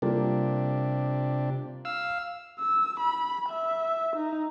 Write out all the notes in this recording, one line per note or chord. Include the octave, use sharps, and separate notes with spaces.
C3 G3 A#3 D4 F4
F5 E6
E6
B5
E5
D#4